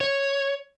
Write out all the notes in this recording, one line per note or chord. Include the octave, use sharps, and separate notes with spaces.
C#5